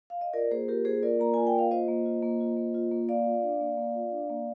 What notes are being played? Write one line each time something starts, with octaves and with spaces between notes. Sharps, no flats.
F5
D#5
F4 A#4 D5
A#3 G#4 C5
F4 G4 A#4
A#3 G#4 C5
F4 A#4 D5
A#3 A#5
F4 G#5
G5
A#3 F5
F4 C5 D#5
A#3
F4
A#3
F4
A#3
F4
A#3
A#3 D5 F5
F4
D4
A#3
A#3
F4
D4
A#3